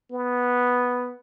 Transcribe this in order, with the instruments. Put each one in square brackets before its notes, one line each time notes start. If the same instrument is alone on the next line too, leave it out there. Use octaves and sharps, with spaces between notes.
[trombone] B3